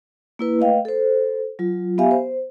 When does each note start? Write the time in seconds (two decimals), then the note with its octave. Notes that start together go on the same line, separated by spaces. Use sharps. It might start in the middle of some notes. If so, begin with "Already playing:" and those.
0.39 A#3 E4 B4
0.59 A3 B4 D#5 F5 G5
0.85 A4 C5
1.59 F#3 F4
1.98 B3 G4 E5 F5 G#5
2.11 C5